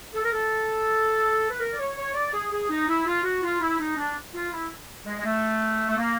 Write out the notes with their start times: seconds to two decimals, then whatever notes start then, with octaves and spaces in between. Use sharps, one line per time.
0.14 A4
0.24 A#4
0.32 A4
1.50 B4
1.60 A#4
1.70 D5
1.79 C#5
1.97 C#5
2.14 D5
2.34 G#4
2.52 G#4
2.70 D#4
2.88 E4
3.06 F4
3.24 F#4
3.43 F4
3.61 E4
3.79 D#4
3.97 D4
4.34 F4
4.52 E4
5.06 G#3
5.19 G#3
5.25 A3
5.89 A3
5.98 A#3